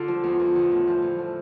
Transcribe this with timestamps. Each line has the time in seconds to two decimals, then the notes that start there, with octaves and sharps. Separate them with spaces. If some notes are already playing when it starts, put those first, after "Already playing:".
Already playing: D3 F4 D5
0.08 F3
0.24 E2
0.40 E2
0.56 D3
0.72 A2
0.87 F3
1.02 A2
1.18 F3